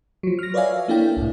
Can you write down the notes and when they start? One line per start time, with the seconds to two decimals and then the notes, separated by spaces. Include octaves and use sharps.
0.23 F3 F#3
0.39 F6 A#6
0.54 B4 C#5 D5 E5 F5 G#5
0.88 A#3 D4 E4 A4 G5
1.17 C2 A2